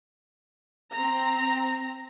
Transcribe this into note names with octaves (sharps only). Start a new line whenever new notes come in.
C4 A#5